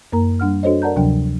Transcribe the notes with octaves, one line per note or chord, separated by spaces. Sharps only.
F#2 A#3 A#4 A#5
G3 D4 F#5 F6
D4 F#4 A4 C5 C#5 D#5
A#4 D5 F#5 A5 A#5 G6
D2 C3 F3 F#3 D4 G5